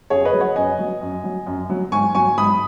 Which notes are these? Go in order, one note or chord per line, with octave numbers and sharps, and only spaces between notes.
F#2 G#4 C#5
B4 D#5
F#3
C#5 F#5
F#2 D#5 G#5
F#3
F#2
F#3
F#2
F#3
G#2 G#5 C#6
F#3 G#5 C#6
G#2 B5 D#6